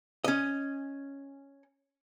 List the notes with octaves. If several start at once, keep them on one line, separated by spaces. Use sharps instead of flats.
C#4 D#5